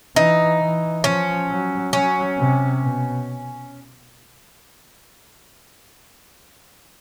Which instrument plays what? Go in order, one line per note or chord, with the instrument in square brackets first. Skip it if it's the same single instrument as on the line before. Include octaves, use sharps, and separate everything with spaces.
[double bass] E3 [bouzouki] D#4
[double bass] E3
[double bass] F3 [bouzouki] C#4
[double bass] F#3
[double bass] F#3 [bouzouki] C#4
[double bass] C3
B2